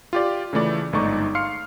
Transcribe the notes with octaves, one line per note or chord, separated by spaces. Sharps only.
F4 G4 D5
C#3 E3 A3 D5
G1 G#2 A3 D#4 D5 C#6
F5 C6 F6 C7 C#7